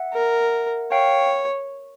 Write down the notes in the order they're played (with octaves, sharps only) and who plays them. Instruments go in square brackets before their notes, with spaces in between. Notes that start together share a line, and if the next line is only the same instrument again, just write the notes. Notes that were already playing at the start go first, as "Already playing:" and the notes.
Already playing: [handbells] E5 F#5
[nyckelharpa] A#4
[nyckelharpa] C#5 [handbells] F5 G5